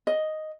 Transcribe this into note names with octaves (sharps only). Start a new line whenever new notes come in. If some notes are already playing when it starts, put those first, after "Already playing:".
D#5